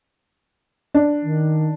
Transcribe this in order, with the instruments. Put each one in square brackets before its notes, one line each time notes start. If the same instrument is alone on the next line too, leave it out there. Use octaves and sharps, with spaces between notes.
[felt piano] D4
[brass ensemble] D#3